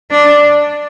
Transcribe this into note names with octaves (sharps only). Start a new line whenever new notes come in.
D4